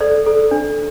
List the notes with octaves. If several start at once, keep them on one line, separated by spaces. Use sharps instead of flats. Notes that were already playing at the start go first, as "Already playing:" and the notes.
A4 D5
A4
D4